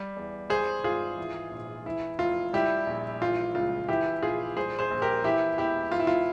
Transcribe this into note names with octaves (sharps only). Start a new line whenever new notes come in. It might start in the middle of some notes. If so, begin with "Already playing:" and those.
Already playing: G3
E2
G3 G#4 C5
G#1 F4 G#4
E3
A#1
E3 E4
F1 F4
G3 E4 G4
A#1
E3 F4
C#2 F4
E3 E4 G4
A#1 F4 G#4
G3 G#4 C5
G#4 C5
A#1
G4 A#4
E3 E4 G4
E1 E4 G4
E3 F4
E4
F4